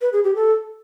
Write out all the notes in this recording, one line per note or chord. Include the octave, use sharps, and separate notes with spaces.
B4
G#4
G4
A4